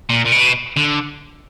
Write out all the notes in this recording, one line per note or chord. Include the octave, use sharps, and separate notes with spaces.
A#2
A#2
B2
D3